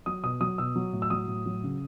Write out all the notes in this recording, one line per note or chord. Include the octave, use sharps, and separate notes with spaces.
F#3 D#6
B2 D#6
F#3 D#6
B2 E6
F#3
A2
E6
F#3 D#6
A2
F#3
C#3